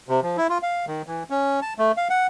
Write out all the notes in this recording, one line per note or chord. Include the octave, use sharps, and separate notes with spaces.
C3
F3
E4
F4
F5
D#3
E3
C#4
A5
A3
F5
F#5